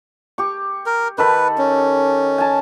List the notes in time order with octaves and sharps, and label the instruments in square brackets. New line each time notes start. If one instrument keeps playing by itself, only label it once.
[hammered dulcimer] G4 C#6
[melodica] A#4
[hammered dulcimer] D#3 A4 B5 [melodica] B4
[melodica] C#4
[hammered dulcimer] G#5 A5